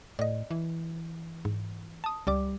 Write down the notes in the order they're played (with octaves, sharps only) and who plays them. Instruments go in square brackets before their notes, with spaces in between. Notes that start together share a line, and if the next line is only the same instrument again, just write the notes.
[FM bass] A2 [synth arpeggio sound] D5 D#5
[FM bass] E3
[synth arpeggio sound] G#2
A5 D#6
[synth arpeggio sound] C#2 D5 D6 [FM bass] G3